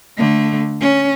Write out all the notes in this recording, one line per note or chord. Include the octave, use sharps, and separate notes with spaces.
D3 A3
C#4